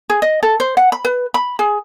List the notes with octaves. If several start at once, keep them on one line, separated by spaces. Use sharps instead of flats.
G#4
D#5
A4
C5
F#5
B5
B4
B5
G#4